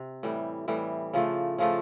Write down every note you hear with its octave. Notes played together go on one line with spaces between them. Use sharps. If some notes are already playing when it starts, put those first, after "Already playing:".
Already playing: C3
A2 E3 G3
A2 E3 G3
C#3 F3 A3
C#3 F3 A3